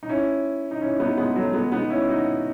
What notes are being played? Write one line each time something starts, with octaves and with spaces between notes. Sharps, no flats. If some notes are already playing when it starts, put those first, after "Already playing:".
D#4
C#4 E4
D#4
C#4 E4
B3 D#4
G#3 B3
F#3 A3
G#3 B3
B3 D#4
C#4 E4
D#4 F#4